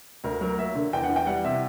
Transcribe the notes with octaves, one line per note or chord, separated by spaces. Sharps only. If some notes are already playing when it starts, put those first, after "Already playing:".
D2 A#4
F#3 A#4
A#3 E5
D3
E2 G5
F#5
E3
G5
G3 F#5
C3 E5